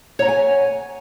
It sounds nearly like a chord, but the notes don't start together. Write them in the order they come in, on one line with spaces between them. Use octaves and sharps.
C#5 A#5 F#5 G#5